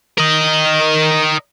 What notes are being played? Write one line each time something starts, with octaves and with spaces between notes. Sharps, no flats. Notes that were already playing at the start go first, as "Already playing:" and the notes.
A#4 D#5